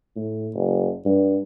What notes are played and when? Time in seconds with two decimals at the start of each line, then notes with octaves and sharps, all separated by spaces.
0.16 A2
0.54 F#1
1.06 G2